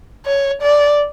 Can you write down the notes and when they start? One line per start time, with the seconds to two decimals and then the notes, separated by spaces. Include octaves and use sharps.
0.25 C#5
0.62 D5